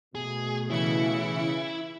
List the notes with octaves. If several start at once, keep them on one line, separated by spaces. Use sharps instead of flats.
B2 A3 G#4
C#3 E3 E4 C#7